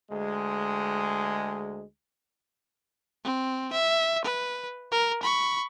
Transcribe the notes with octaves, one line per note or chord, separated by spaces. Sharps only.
D2 G#3
C4
E5
B4
A#4
B5 C#6